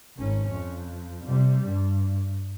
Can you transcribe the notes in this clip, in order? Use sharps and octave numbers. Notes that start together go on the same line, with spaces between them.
G#1 C#4
F2
C3 G3
G2